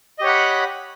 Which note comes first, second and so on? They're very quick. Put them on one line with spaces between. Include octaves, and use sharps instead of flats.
D#5 G4 C#5 F#5 B5